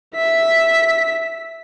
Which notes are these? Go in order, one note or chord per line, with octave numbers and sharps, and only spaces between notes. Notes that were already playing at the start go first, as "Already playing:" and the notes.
E5 B6